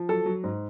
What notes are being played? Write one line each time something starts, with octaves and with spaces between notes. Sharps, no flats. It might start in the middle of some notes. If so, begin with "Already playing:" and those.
Already playing: F3
F#3 A4
F#3
G#2